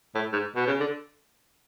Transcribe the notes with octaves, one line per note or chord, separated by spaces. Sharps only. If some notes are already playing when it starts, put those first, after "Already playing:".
A2
G#2
B2
C#3
D3